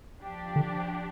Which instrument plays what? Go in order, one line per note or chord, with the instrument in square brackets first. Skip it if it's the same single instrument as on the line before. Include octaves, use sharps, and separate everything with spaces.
[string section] F3 D4 G4
[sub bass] D3